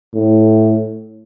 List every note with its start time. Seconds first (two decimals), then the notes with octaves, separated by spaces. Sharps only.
0.15 A2